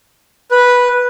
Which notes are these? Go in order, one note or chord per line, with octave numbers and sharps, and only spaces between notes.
B4